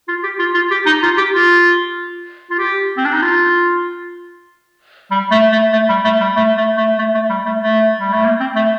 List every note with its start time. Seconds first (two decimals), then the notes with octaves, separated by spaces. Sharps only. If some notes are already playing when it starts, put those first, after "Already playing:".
0.08 F4
0.24 G4
0.39 F4
0.54 F4
0.71 G4
0.86 D#4
1.03 F4
1.18 G4
1.33 F4
2.51 F4
2.59 G4
2.97 C4
3.05 D4
3.13 D#4
3.22 F4
5.11 G3
5.31 A3
5.52 A3
5.73 A3
5.89 G3
6.05 A3
6.21 G3
6.36 A3
6.57 A3
6.77 A3
6.99 A3
7.15 A3
7.30 G3
7.46 A3
7.62 A3
8.00 G3
8.13 A3
8.25 A#3
8.40 C4
8.56 A3